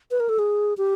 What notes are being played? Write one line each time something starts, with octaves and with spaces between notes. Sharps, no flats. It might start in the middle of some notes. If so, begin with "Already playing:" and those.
B4
A#4
A4
G#4
G4